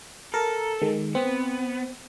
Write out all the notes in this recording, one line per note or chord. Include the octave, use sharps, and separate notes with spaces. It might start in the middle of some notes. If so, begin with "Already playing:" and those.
A4 A#4
D#3 G#3
B3 C4